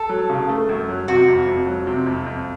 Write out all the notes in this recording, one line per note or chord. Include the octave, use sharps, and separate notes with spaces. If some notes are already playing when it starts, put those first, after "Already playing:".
Already playing: A4
F#3
C#3
A3
F#2
F#3
C3 F#4
F2
F2
F#3
C3
F2
F2